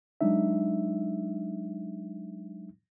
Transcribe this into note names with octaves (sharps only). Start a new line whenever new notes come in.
F#3 G#3 D4 D#4 E5